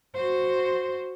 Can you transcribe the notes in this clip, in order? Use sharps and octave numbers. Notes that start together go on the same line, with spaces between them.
F#4 C5